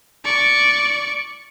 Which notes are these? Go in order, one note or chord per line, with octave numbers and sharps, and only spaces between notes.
D5 C#6